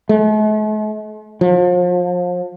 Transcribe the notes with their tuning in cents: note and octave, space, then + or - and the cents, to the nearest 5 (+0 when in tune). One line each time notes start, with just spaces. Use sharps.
A3 -45
F3 +35